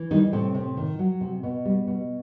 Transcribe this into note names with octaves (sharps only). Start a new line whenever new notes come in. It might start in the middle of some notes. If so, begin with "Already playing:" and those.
Already playing: E3
D#3 G3 D#4
A2 C3 C4
C3
D#3
F#3
C3
B2
G3
B2